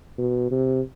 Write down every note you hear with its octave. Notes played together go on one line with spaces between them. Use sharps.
B2
C3